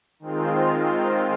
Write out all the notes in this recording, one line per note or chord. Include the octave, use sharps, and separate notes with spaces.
D#3 G#3 C4 F4